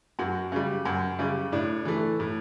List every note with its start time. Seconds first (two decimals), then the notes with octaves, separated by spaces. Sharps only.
0.19 F#2 F#4
0.52 C#3 G3
0.85 F#2
1.19 C#3 G3
1.52 A2 D4
1.85 E3 A3
2.20 A2